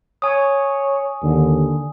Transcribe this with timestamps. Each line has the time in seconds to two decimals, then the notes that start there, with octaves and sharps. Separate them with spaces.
0.22 C#5 G#5 D#6
1.23 D#2 D3